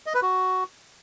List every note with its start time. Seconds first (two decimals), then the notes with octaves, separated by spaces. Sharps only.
0.06 D#5
0.14 B4
0.22 F#4